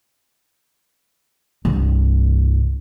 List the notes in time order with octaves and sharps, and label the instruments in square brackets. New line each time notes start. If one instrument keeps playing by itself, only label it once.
[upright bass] C2 G2